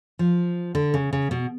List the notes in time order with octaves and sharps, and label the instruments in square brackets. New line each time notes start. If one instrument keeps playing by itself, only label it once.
[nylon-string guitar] F3
D3
C#3
C#3
B2